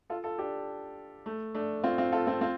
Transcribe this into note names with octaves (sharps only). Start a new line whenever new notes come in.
F4 A4
F4 A4
D4 G4
A3
A3 D4
C4 F4
C4 F4
F4 A4
C4 F4
C4 F4